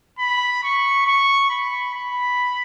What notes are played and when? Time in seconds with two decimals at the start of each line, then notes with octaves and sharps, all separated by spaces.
0.19 B5
0.63 C#6
1.06 C#6
1.50 B5
1.94 B5